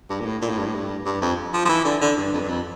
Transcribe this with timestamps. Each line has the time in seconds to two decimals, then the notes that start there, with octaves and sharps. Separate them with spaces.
0.10 G2
0.20 A#2
0.25 A2
0.42 A#2
0.50 A2
0.57 G2
0.66 A2
0.74 G2
1.05 G2
1.22 F2
1.53 F3
1.65 F3
1.69 E3
1.85 D3
2.01 D3
2.17 G2
2.33 F2
2.41 G2
2.48 F2